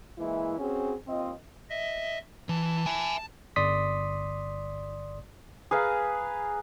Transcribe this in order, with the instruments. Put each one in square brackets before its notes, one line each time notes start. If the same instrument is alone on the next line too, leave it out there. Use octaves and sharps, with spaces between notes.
[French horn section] E3 G#3 A#3 E4
C4 C#4 F#4 G#4
D#2 C4 F4 D#5
[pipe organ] D#5 E5
[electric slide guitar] E3 [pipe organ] A5
[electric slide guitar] E5 G#5
[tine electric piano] G1 D5 C6 D#6 B6
[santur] G#4 B4 F5 A#5